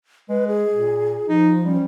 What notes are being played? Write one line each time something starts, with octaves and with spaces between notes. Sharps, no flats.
G#3 B4
G#4
A#2
F3 D#4
G3 C#4